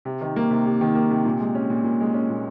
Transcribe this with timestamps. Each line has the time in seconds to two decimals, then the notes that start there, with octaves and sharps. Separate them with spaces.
0.05 C3
0.21 D#3
0.36 A#3
0.51 C3
0.66 C3
0.81 D#3
0.95 A#3
1.10 C3
1.25 A#2
1.40 G#3
1.55 C#4
1.70 A#2
1.84 A#2
2.00 G#3
2.14 C#4
2.30 A#2